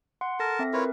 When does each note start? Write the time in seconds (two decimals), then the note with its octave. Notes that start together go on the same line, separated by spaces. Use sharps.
0.21 F#5 C6
0.40 A4 A#4 A5 A#6
0.59 C4 A4 E5
0.73 E4 F4 A#4 B4 C#5